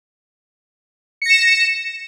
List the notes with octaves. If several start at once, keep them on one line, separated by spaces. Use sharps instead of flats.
A#6 C#7 E7